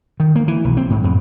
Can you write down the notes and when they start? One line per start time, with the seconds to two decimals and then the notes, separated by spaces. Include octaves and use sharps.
0.20 D#3
0.36 A#3
0.48 E3
0.65 B1
0.77 C4
0.90 G#2
1.04 F2